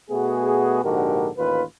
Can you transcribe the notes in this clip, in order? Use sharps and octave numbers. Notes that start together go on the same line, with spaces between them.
B2 A3 B3 F#4 G#4
A#1 G#2 D3 F#4 G4 A#4
A1 D#2 F4 B4